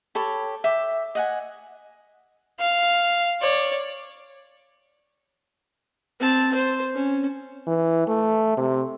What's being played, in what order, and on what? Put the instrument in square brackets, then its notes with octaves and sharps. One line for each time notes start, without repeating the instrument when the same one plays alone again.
[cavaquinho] G4 A4 C#5 B5
E5 G5 D6
D#5 F#5 G#5
[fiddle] F5
C#5 D5
[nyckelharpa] C4 A5
C5
C#4
[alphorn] E3
A3
C3